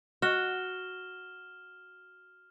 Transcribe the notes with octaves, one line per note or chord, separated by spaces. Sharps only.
F#4 F6 E7 G7